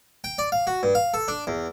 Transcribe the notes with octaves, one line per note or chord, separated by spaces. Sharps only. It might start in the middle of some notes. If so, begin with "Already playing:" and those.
G5
D5
F5
F#4
G2
F5
A4
D4
E2